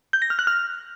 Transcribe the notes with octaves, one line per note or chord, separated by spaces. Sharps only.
G6
A#6
F6
F#6
F6